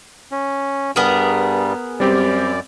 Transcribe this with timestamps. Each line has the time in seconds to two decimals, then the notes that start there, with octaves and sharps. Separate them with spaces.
0.32 C#4
0.96 G2 G3 B3 G#4 A#4
2.00 F#2 G3 C4 G4 D5